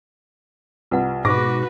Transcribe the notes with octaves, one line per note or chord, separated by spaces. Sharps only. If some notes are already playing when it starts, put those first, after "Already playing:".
C2 F4 B4 F#5
G#2 B2 F#4 B4 C#6 D6 A#6